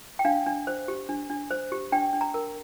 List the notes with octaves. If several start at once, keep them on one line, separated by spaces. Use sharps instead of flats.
G5
D4 F5
D4
C5
G4
D4
D4
C5
G4
D4 G5
D4
A#5
A#4